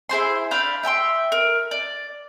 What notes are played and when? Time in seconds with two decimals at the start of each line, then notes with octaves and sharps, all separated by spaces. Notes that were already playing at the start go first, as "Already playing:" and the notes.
0.09 E4 G#4 C5 C6
0.51 D4 F5 B5 G6
0.83 E5 G5 A5 C6
1.32 A#4
1.71 D5